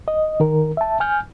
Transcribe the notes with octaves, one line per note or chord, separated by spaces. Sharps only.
D#5
D#3 A#4
E5 A5
G#5 F6 G6